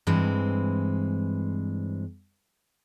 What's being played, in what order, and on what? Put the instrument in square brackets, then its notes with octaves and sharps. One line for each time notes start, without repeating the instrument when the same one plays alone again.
[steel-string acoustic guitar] G2 E3 G#3 C4